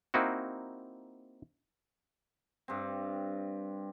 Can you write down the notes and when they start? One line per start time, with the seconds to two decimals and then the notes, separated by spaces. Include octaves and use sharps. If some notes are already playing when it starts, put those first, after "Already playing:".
0.14 A#3 C4 D#4 E4 F#4
2.68 G2 C4